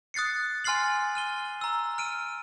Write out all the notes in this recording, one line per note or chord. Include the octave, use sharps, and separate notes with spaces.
D#6 F#6 A6 C7 C#7
G#5 C6 F6 A6 C7 F#7
F6 D#7 G7
A#5 E6
F6 D7 D#7